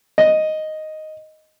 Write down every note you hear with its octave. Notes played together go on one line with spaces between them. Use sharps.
D#5